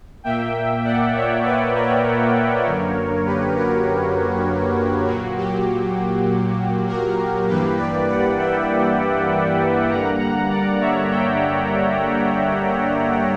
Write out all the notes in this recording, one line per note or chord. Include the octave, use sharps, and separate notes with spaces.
A#2 A#3 E5 G5
D5 F#5
C#5 E5
B4 D5
A#4 C#5
F#2 D3 A#3
G4 B4
F#4 A#4
A#2 F#3 A#3 F#4
G4
F#4 A#4
G2 E3 A#3 G4 B4
B4 D5
D5 F#5
E5 G5
G2 D3 G3 A#3 F#5 A#5
F#5 A#5
D5 F#5
C#5 E5
E5 G5